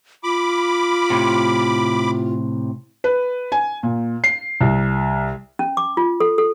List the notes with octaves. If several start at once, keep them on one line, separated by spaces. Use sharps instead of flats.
F4 B5 D6
A2 C3
B4
G#5
A#2
C7
C2
C#4
D6
F4
A4
A4